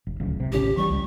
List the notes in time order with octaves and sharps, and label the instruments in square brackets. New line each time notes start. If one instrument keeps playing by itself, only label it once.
[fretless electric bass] F1
D1 C#2
C3
[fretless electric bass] G#1 C#2 C#4 [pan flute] G4
[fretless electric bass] E3 G3 [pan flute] C#6
[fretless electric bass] C#2